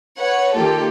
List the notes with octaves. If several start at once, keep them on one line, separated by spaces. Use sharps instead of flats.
B4 C#5 F#5
D#3 A#3 F4 G4 A4